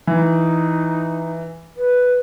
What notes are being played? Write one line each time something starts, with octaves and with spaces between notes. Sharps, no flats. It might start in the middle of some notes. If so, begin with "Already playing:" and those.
E3 D#4
B4